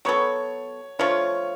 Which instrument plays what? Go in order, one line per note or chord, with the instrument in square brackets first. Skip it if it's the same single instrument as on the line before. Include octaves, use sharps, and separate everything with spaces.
[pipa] F#3 B3 F#4 A4 [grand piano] C#5 C#6
[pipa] F3 A3 D4 F4 [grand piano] C#5 C#6